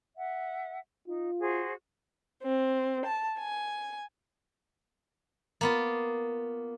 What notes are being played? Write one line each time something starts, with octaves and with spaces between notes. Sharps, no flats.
E5 F#5
D#4 F4
F#4 G#4 C5
C4
A5
G#5
A#3 B3 F4